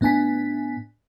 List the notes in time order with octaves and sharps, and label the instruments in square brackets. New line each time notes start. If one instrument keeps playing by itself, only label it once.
[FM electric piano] A2 B3 D4 G#5 B6